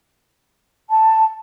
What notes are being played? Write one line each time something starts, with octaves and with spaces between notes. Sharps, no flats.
A5